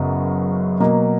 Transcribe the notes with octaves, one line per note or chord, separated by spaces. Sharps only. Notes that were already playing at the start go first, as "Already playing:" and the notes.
Already playing: F#1 F#2 C#3 F#3 B3
B2 F#3 A#3